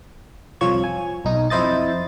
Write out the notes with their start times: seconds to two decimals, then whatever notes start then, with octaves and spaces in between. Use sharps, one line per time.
0.61 C2 F2 F3 F4 C#5 G#6
0.84 G#5
1.25 B1 D#4
1.50 F2 E4 C5 D#5 A6